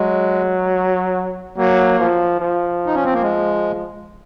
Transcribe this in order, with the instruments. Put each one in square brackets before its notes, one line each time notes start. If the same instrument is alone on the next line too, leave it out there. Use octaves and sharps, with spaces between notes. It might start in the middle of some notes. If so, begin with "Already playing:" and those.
Already playing: [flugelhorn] F#3 [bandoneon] G#3
[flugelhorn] F#3 [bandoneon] A#3
[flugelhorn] F3
F3
[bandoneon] D#4
C#4
C4
A#3
G#3